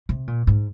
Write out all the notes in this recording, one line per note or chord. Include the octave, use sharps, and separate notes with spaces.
C3
A#2
G#2